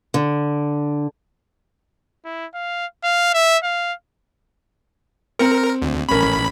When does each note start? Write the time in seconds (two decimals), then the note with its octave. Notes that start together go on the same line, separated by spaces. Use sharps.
0.14 D3
2.25 E4
2.54 F5
3.04 F5
3.34 E5
3.63 F5
5.39 C4 A#4 C#7
5.82 D2
6.09 A1 C#4 A#4 B5